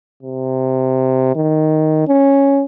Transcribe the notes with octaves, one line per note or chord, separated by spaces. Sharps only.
C3
D#3
C#4